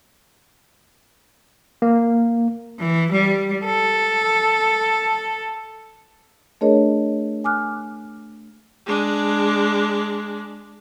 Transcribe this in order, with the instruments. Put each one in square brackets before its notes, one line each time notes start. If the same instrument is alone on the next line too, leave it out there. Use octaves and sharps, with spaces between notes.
[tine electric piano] A#3
[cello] E3
G3
A4
[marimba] A3 D4 G#4 A#4 C#5 D#5
G#5 D6 F6 F#6
[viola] G#3 D4